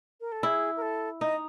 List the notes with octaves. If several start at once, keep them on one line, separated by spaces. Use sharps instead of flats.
A#4
A4
E4 G#4
A#4
A4
D#4 D#5